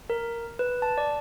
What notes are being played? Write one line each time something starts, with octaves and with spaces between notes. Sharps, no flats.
A#4
B4
A5
D5